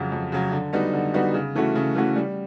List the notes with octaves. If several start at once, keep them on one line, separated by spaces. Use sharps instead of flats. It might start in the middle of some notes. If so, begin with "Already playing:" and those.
Already playing: F2 C#3 F#3
F2
C#3 F#3
D3
G3 B3 D#4 F#4
D3
G3 B3 D#4 F#4
C#3
E3 A3 C#4 F#4
C#3
E3 A3 C#4 F#4
G3